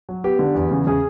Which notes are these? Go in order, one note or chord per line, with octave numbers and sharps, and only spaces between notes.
F#3
B3 G4
D3
E2
C#3
C#3 G#4